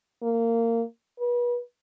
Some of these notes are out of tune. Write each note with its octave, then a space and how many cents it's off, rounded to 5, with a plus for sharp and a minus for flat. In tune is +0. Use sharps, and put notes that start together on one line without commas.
A#3 -20
B4 -35